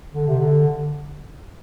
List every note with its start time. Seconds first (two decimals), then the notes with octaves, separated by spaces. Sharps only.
0.14 D3
0.27 C3
0.39 D3